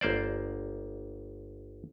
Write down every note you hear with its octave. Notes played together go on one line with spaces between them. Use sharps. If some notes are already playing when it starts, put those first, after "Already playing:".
G1 A#3 C5 D5